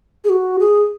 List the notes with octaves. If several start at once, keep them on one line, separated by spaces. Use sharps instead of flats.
G#4
F#4
G#4